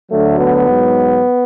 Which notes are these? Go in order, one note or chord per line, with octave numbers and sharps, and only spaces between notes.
D2 D3 F#3 A3
B3
G#2 F#3